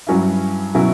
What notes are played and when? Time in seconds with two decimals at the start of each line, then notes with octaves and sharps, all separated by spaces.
0.07 G2 F#3 C#4 E4
0.74 B2 F#3 C#4 E4